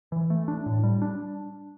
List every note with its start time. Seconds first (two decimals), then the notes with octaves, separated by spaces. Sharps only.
0.12 E3
0.30 A3
0.48 D4
0.66 A2
0.84 G3
1.02 D4